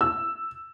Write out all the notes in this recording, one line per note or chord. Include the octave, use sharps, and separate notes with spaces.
E6